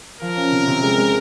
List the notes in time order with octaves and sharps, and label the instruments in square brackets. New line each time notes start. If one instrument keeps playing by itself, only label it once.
[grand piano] F3 [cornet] A#4
[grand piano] C#4
C3
C3
G#3
G#3